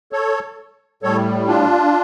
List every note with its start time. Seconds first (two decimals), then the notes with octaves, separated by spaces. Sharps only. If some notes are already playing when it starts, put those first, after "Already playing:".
0.12 A4 C#5
1.03 A2 G3 A4 C#5
1.47 D4 F4